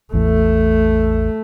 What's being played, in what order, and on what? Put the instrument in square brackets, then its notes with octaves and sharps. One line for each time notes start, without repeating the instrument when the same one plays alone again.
[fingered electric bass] A1 E2 A2 [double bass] A3